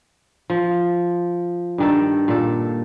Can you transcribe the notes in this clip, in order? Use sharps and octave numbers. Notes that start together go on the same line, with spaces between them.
F3
G2 D#3 A4
A#2 A4